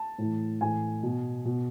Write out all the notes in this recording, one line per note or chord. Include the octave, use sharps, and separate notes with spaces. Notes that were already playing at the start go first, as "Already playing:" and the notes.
Already playing: A5
A2 E3
A2 E3 G#5
B2
B2